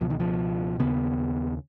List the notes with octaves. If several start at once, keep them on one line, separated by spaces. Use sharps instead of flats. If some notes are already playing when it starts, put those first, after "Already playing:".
C#2 B2 F3
D#3
F3
D#2 C#3 B3